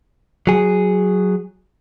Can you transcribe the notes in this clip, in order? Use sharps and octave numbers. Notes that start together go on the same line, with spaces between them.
F#3 G#4